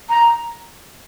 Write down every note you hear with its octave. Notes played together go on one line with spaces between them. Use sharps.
A#5